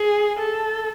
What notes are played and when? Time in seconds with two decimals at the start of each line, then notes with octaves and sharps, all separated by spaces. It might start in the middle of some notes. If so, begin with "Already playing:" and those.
Already playing: G#4
0.39 A4